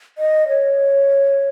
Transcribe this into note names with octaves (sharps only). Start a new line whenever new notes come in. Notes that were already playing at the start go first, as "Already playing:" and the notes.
D#5
C#5